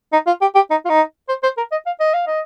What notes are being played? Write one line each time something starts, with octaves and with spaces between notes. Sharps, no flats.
D#4
F4
G4
G4
D#4
F4
D#4
C5
C5
A#4
D#5
F5
D#5
F5
D#5